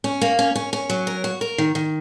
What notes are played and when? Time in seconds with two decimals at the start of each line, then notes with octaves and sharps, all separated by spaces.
0.04 C#4
0.21 A#3
0.39 C#4
0.56 C#4
0.73 C#4
0.90 F#3
1.07 A#4
1.24 F#4
1.41 A#4
1.58 D#3
1.75 D#3